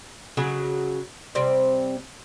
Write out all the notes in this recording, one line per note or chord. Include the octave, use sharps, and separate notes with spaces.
C#3 F#3 G#4
C3 G3 C4